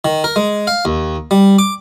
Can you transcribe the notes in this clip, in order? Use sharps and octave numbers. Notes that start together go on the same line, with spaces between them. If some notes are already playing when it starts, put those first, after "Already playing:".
D#3
A#4
G#3
F5
D#2
G3
D6